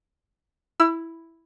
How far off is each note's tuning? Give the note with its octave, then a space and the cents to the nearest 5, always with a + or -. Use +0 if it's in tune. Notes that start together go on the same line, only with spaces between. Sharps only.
E4 +0 E6 +30